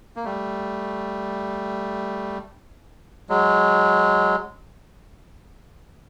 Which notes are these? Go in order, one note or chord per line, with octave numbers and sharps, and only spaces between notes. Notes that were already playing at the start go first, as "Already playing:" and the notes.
A#3
G3 A3
F#3 G#3